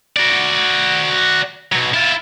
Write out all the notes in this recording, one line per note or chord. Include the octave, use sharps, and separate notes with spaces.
F#4 D5
B2 F#3
E4 F4